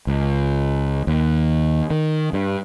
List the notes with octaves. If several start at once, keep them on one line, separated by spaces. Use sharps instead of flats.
C#2
D#2
D#3
G2